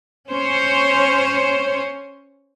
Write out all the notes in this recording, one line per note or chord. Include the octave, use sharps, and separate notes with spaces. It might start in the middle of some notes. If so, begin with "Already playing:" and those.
C#4 C5 C#5